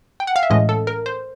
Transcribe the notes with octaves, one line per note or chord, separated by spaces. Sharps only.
G5
F#5
F5
E5
A2 E3 G#3 C#4 D#5
A4
A#4
C5